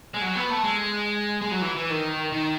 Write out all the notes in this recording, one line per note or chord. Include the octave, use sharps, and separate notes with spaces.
G#3
F#3
B3
A3
G#3
G#3
F#3
E3
E3
D#3
D#3